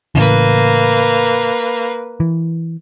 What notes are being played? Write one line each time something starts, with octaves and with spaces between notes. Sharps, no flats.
A2 C#3 E3 A#3 B4
E3